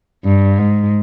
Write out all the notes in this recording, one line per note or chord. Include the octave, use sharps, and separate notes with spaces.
G2
G#2